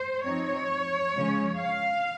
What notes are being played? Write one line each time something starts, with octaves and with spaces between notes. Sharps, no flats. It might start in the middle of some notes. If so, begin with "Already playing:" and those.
Already playing: C5
F3 C4 D#4 C#5
C#3 F3 G#3 C#4
F5